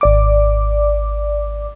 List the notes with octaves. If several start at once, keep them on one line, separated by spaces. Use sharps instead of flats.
G#1 D5 D6